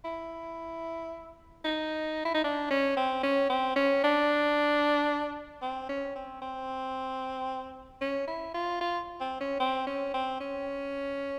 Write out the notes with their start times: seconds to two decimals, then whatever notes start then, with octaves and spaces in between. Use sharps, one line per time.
0.04 E4
1.64 D#4
2.25 E4
2.34 D#4
2.44 D4
2.71 C#4
2.97 C4
3.23 C#4
3.50 C4
3.76 C#4
4.04 D4
5.62 C4
5.89 C#4
6.15 C4
6.42 C4
8.01 C#4
8.27 E4
8.54 F4
8.81 F4
9.20 C4
9.41 C#4
9.60 C4
9.87 C#4
10.14 C4
10.40 C#4